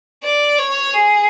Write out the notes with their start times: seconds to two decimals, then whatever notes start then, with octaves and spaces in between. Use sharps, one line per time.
0.24 D5
0.58 C#5
0.93 G#4